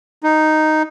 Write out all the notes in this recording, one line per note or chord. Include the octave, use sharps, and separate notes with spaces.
D#4